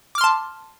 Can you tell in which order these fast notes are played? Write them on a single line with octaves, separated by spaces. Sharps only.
D6 F6 C6 A5